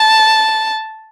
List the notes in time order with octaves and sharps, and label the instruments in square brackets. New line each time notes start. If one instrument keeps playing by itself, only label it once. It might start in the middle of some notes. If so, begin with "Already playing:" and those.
Already playing: [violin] A5